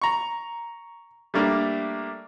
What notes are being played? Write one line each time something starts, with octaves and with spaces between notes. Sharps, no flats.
A#5 C#6
G3 A3 A#3 D4